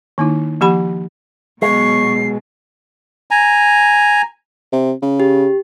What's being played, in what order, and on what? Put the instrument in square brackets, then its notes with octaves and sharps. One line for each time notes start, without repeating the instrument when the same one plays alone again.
[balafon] D#3 A#3 D#4 E4
F3 A#3 G4 F#5 B5
[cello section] B2 F#3 [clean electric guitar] G#3 [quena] C#6 [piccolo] C7
[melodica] G#5 A#5
[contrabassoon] C3
C#3
[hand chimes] G4